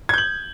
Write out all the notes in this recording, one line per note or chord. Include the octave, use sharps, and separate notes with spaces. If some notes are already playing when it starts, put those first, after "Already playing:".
G6 G#6 F#7